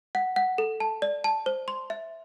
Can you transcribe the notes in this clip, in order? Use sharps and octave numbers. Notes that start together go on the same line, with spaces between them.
F#5
F#5
A4
A5
D5
A5
C5
C6
E5